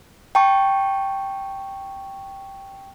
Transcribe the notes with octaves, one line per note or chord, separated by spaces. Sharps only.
G5 A5 C#6